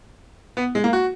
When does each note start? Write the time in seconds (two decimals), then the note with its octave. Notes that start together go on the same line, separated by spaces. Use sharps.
0.57 B3
0.75 G#3
0.84 A#3
0.93 F#4